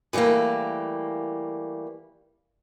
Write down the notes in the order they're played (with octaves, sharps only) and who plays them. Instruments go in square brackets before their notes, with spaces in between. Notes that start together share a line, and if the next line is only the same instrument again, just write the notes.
[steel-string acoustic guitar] E3 F3 G3 A3 A#3